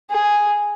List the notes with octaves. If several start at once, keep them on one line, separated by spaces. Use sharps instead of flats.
G#4